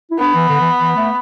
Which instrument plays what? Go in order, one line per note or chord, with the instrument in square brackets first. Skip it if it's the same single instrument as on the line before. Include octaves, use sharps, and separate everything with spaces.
[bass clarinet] E4
[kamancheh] B3 [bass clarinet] D4
[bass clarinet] E3
D3
E3
E3
A3